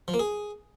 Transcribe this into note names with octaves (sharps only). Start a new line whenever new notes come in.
F3
A#3
G#4